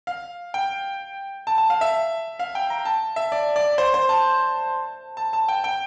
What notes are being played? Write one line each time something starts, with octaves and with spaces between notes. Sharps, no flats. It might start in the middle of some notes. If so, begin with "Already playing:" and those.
F5
G5
A5
A5
F5
E5
F5
G5
A#5
A5
E5
D5
D5
C5
C5
A5
A5
A5
G5
G5